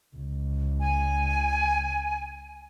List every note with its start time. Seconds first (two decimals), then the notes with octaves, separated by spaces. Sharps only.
0.16 C#2
0.80 G#5